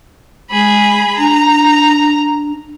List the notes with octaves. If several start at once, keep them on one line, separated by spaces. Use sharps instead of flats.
G#3 G#4 B5
D4 A#5